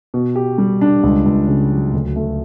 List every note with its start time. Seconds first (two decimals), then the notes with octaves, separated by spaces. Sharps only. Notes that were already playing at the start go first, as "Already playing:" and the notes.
0.14 B2
0.36 G4
0.58 G3
0.81 D4
1.03 C#2
1.26 C#2
1.48 C#3
1.71 F#3
1.93 D2
2.16 A3